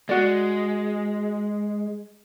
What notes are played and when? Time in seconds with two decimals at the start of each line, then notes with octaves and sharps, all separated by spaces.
0.09 G#3 F#4 D5